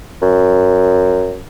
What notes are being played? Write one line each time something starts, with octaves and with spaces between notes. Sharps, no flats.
F#2